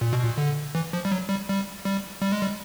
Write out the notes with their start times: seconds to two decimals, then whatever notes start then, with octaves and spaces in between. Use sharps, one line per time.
0.01 A#2
0.13 B2
0.24 A#2
0.38 D3
0.75 E3
0.93 F3
1.05 G3
1.12 F#3
1.29 G3
1.49 G3
1.85 G3
2.22 G3
2.32 G#3
2.41 G3